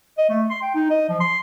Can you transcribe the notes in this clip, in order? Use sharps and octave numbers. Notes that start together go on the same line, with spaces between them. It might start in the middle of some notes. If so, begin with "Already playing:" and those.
D#5
A3
C6
G5
D#4
D#5
F3
C6